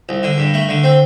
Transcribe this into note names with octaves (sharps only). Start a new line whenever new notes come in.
C2
D3
G2
A3
D3
C4